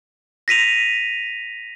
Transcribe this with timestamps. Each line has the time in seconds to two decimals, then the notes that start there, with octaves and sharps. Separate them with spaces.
0.48 A#6 B6 D#7 F7